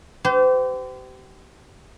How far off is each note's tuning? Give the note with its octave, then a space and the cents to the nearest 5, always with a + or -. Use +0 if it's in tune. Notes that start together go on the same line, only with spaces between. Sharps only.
G4 -30 C5 -40